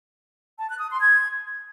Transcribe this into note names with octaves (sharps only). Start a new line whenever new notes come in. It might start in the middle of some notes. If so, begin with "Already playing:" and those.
A5
F#6
D#6
C6
G#6